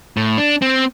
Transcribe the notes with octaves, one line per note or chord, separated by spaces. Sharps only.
A2
D4
C4